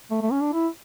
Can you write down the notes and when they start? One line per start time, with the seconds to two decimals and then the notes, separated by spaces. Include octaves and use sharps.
0.11 A3
0.22 A3
0.32 C#4
0.42 D4
0.53 E4